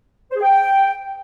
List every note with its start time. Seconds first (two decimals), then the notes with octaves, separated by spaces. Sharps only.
0.31 C5
0.36 G#4
0.41 G5